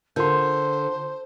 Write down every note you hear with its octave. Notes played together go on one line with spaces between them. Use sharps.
D3 F4 A#4 C5 C6 G6